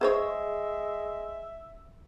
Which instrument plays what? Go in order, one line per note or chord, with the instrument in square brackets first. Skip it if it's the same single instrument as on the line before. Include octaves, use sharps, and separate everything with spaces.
[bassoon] G#3 [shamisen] G#4 C5 C#5 [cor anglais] E5